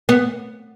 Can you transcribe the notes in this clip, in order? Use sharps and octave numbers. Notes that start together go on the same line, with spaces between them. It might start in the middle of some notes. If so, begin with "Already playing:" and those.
B3